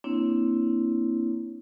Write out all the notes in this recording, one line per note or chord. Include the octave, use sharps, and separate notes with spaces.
A#3 C4 D4 E4 C#5